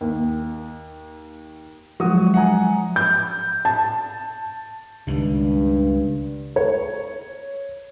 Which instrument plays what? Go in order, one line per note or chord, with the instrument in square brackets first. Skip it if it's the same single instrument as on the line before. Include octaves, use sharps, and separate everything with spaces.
[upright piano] D#2
[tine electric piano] F3 F#3 G#3 [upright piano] F#4 D#6
[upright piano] F#5 G#5 A#5
[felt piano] G6
A5
[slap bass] C#2 D#3 [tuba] G2
[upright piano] C#5